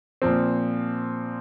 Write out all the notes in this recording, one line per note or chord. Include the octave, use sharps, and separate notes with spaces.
A#2 F3 C4